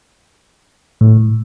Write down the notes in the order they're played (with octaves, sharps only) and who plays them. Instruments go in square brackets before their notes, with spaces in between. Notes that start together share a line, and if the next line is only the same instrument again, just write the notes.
[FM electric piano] A2